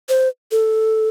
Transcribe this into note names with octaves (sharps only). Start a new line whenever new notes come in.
C5
A4